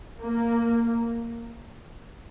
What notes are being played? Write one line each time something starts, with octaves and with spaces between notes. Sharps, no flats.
A#3